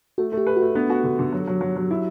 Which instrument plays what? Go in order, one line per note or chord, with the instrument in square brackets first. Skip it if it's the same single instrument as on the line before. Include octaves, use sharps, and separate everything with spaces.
[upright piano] A3 [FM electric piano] F#4
[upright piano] A3
[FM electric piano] G4
[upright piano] B4
[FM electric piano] F#4
[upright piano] A3
[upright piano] B3 [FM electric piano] D4
[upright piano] F#4
D3
D3
F#3
F#3
F#3
F#3
E4